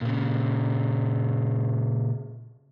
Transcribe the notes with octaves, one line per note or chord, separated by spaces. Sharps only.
A#2 C#3